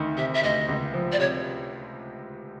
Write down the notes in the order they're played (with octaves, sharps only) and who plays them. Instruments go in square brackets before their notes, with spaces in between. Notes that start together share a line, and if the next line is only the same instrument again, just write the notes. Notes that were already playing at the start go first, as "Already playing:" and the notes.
Already playing: [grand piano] D2 D#3
[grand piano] C3 [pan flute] E5
[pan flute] E5
[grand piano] D2 [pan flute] D#5
[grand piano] C#2
F3
[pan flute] D5
[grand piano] C3 [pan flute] C#5